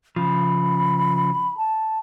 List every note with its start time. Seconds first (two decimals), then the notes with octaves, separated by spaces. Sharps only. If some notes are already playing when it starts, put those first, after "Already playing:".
0.16 C#3 F3 B5
1.57 A5